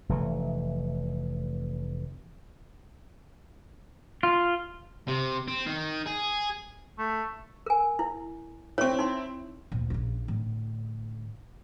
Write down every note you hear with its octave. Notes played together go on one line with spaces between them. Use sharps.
F1 E3 A3
F4
C3
C4
D#3
G#4
A3
A#4 G#5
E4
C4 E4 C#5 C#6
D#4 C6
D2 A#2
A#1 C#3
A2 D3